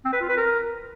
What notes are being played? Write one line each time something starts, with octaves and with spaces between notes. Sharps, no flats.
C4
B4
F4
B4
A#4